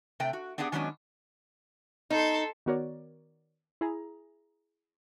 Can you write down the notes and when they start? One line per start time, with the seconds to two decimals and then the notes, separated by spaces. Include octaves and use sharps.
0.20 C3 A3 G5
0.33 F#4
0.58 B3 D4 G4 G#4 F#5
0.72 D#3 F#3 G#3 B3 C#4 D4
2.10 D#4 A4 C6
2.66 D#3 B3 F#4 A#4 C#5 D5
3.81 E4 G#4 A#5